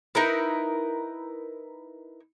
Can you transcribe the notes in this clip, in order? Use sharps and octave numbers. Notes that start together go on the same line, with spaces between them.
D#4 E4 A#4 B4